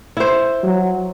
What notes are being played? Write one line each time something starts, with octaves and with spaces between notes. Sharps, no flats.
E4 C5
F#3